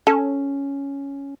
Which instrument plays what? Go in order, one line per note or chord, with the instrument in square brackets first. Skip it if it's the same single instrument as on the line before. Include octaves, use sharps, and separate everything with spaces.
[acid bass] C#4 [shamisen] A4